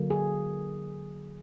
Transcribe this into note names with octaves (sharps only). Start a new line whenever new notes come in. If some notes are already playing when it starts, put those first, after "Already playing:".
Already playing: D3 F#3 A#3
G#4